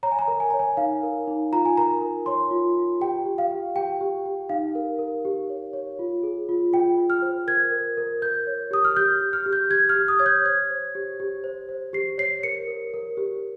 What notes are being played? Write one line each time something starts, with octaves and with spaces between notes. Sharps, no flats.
C#5 A#5
G#5
A#5
A#4
G#5
C#5 A#5
G#5
D#4 F5
A#4
D#4
F4 A#5
G#5
A#4 A#5
A#4
C#5 C6
F4
F4
G4 G5
G4
F5
G4
G4 G5
G4
G4
D#4 F5
A#4
A#4
G4
C#5
C#5
F4
G#4
F4
F4 G5
F4
F6
C5
A#4 G#6
A#4
A#4
A#4 G6
C#5
G4 D#6
F6
G4 G6
G4
F6
G4
G6
G4 G#6
F6
G4
D#6
C#5 G#6
G6
C5 G#6
C5
G4
G4
C5
C5
G4 C7
C#5 C7
A#4 C#7
A#4
A#4
G4